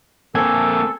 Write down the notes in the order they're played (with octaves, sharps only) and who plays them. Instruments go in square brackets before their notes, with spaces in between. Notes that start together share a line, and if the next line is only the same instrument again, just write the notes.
[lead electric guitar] A#3 C4 [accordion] A4 [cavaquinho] G#5